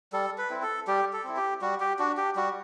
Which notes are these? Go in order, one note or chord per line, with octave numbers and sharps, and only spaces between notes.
G3 A4
B4
C4 E4
A4
G3 G4
A4
C4 E4
G4
G3 F#4
G4
D4 F#4
G4
G3 F#4